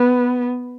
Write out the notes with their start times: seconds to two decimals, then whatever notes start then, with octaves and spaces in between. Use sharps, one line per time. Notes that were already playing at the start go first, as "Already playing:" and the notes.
Already playing: B3